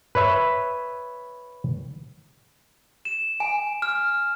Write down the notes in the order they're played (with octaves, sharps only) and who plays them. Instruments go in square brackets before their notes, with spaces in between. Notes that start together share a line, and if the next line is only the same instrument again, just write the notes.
[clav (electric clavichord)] B4 C#5 E5
[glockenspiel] E7
G#5
F6